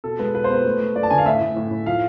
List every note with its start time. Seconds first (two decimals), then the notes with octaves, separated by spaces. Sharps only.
0.04 B2 A4
0.19 G#3 B4
0.34 B2 B4
0.44 C5
0.50 B3 B4
0.65 A3
0.80 A3
0.96 A3 D5
1.03 A5
1.11 D3 G#5
1.18 F5
1.26 A2 E5
1.41 A2
1.56 A2
1.71 A2
1.86 F3 F5